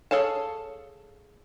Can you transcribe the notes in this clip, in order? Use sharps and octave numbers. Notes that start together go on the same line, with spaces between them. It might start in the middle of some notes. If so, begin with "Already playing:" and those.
G#4 A4 C#5 F5 A5